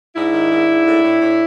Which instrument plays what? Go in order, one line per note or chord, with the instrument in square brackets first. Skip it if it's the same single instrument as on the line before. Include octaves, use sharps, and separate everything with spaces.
[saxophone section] G#2 D4 E4
D#3
G#2
G#2
A2
A2
A2